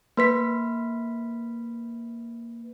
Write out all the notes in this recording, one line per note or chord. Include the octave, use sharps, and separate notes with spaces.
A#3 B4 B6